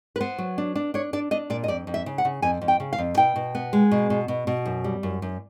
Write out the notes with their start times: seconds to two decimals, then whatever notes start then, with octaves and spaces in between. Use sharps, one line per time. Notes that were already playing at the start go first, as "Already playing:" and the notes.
0.16 B4
0.21 B3 C5
0.38 F#3
0.58 D4
0.75 D4
0.94 D4 C#5
1.13 D4 D5
1.31 D4 D#5
1.50 A#2 D5
1.64 D#5
1.68 F2 D5
1.87 F2
1.94 E5
2.06 C#3
2.18 F#5
2.25 C#3
2.42 F2 G#5
2.61 F2
2.68 G5
2.80 C#3
2.93 F5
2.98 F2
3.17 B2 G5
3.36 B2
3.55 B3
3.73 G#3
3.91 B2
4.10 B2
4.28 B2
4.47 B2
4.66 F#2
4.84 G3
5.03 F#2
5.22 F#2